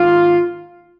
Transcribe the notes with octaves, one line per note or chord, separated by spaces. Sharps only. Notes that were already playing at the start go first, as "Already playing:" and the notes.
Already playing: G#2 D#3 A#3 F4